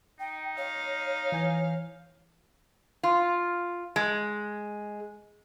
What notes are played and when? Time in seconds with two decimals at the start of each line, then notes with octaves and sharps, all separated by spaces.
0.20 D#4 G5
0.57 C#5 F5
1.32 E3 G#5 G6
3.03 F4
3.96 G#3